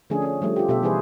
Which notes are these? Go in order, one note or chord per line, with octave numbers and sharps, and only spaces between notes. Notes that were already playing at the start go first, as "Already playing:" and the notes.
D3 F3 A3 C#4 D4 G#4
C#4 G#4
F3 G3 A3
F4 G4
B2 G4 A4 E5
E3 G3 D#4 G#4 B4 C5